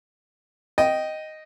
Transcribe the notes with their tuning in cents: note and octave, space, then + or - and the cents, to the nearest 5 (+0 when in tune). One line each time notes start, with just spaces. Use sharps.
D#5 +0 G5 -10